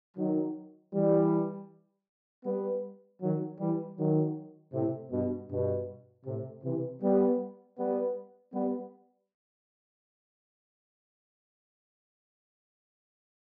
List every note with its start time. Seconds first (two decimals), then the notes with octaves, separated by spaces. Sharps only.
0.17 D#3 F#3
0.94 E3 G3
2.45 G3 B3
3.22 D#3 F#3
3.60 E3 G3
3.97 D#3 F#3
4.73 A2 C3
5.12 G2 B2
5.50 G2 B2
6.25 A2 C3
6.64 C3 E3
7.01 G3 B3
7.78 G3 B3
8.54 G3 B3